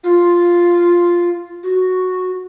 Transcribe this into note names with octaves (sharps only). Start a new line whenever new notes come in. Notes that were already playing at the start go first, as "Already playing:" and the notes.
F4
F#4